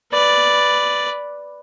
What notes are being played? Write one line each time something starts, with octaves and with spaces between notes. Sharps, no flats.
B4 D5